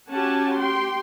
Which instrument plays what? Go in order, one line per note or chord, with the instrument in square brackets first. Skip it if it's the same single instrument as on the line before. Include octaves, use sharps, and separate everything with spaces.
[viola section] C#4 F#4 G4 F#5 G#5 A5
G4 G5 C6